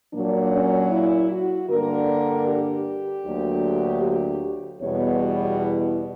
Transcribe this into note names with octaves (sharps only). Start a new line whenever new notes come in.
A#2 F#3 A#3 D4
C#4
E4
F#4
G2 D3 A#3 A#4
G4
D2 D3 F#3 A#3
G4
E2 B2 G3 B3 C#5
F#4
E4